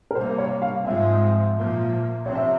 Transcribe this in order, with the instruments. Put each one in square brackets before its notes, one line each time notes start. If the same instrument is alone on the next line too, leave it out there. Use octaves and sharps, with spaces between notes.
[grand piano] A#4
[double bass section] C3 G3 A#3 [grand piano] C5
[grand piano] C#5
F5
[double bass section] G#2 F3 G#3 C4 [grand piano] E5
[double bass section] A#2 F3 A#3
[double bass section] C3 F3 C4 [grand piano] C#5
[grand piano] E5